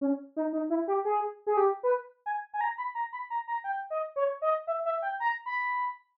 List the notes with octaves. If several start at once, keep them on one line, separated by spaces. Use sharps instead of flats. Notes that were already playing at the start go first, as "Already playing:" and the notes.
C#4
D#4
D#4
E4
G4
G#4
G#4
G4
B4
G#5
G#5
A#5
B5
A#5
B5
A#5
A#5
G5
D#5
C#5
D#5
E5
E5
G5
A#5
B5